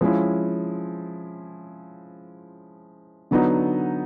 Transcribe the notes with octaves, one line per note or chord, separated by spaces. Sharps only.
F3 G#3 C#4 E4
D3 F#3 B3 D#4